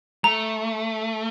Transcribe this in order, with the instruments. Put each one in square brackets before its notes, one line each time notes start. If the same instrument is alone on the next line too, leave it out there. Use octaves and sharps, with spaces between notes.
[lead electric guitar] A3 [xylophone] A#5